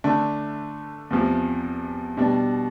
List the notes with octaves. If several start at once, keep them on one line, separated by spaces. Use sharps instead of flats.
D3 A3 D4
E2 C3 F3
B2 G3 D4